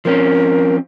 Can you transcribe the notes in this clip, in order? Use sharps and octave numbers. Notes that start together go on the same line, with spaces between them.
F3 C4 C#4 A#4